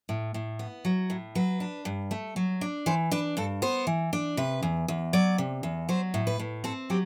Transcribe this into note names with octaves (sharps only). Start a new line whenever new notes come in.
A2
A2
B3
F#3
A2
F#3 B4
D4
G2
A3
F#3
D4
E3 C5
D4 B4
G2 A4
B3 C5
E3
D4
C3 B4
E2
E2
F#3 D5
C3
E2
F#3 C5
A2
B4
A2
C4 A4
F#3 G4